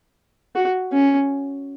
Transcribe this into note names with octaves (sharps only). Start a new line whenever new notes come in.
F#4
C#4